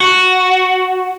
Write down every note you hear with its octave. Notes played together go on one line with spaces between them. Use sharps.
F#4